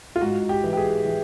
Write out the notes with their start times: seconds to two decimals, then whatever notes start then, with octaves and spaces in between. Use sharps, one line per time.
0.16 F4
0.21 G#2 F#4
0.49 G4
0.64 E3
0.73 G4
0.77 G#4
1.05 E3